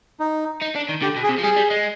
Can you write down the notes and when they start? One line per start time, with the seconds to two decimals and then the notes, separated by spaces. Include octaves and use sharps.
0.20 D#4
0.61 D#4
0.75 D4
0.89 D#3
1.02 D3 G4
1.16 B2
1.23 G#4
1.29 C3
1.39 F3
1.43 G3 G#4
1.57 G3
1.70 G#3